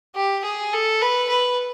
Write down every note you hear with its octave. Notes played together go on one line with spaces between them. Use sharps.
G4
G#4
A4
B4
B4